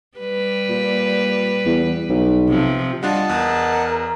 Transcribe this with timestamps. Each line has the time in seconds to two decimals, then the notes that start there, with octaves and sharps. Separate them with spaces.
0.18 G3 B4
0.69 A#2
1.66 E2
2.09 B1
2.48 C3 F3
3.03 G3 D4 F4 D#5 F#5 A5
3.29 E2 A#4